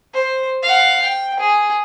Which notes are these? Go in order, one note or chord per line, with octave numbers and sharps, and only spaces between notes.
C5
F5 F#5
G5
G#4